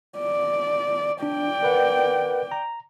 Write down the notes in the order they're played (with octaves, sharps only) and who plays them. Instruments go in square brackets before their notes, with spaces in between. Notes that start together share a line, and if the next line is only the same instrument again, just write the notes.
[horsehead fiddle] D5
[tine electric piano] D4 [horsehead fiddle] D5 G5
[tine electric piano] A#4 B4 F#5
A#5